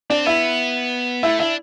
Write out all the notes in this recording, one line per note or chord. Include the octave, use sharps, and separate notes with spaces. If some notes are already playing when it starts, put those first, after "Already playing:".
C4 D4
B3 E4
A3 E4
D4 E4